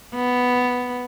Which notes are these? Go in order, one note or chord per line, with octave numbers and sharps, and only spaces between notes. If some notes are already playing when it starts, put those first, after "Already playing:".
B3